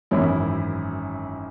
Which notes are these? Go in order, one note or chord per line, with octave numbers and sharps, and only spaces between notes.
G#1 F#2 E3 C#4 E4